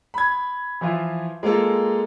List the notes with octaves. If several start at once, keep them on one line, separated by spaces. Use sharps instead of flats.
B5 G#6
E3 F3 E4 F4
G#3 A#3 F4 A4